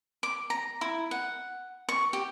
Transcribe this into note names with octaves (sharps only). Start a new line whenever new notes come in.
D6
A#5
E4
F#5
C#6
G4